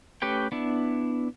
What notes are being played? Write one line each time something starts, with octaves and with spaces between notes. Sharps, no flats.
A3 C#4 G4 B4 G5
B3 D4 E4